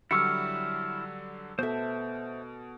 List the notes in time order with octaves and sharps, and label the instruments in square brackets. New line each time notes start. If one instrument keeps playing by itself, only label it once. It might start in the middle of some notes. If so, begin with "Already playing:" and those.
[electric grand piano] D3 F#3 G3 [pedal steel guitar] E4 C#6 F6 [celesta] E6 C#7
[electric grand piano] B2 [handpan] B3 A4 [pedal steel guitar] C5 E5